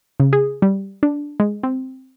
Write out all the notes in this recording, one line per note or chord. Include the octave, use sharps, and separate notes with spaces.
C#3
G#4
G3
D4
G#3
C4